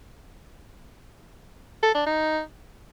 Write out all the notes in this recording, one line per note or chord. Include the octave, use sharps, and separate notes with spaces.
A4
D4
D#4